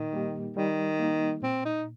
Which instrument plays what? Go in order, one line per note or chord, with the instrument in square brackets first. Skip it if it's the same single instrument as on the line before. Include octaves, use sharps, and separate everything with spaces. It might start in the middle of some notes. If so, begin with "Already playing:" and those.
Already playing: [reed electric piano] A#2 [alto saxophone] D#3
[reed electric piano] G3 A#3 D#4 G4
[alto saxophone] D#3 [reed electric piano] G3
[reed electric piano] A#3 D#4
[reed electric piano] A#2 [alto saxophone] C4
[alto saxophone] D#4